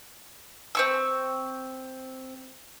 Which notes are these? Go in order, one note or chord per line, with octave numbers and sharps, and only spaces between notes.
C4 C#6 E6